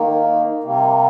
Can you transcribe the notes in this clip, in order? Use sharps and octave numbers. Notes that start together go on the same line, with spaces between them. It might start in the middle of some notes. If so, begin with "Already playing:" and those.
Already playing: D#3 A#3
C3 G3 A#3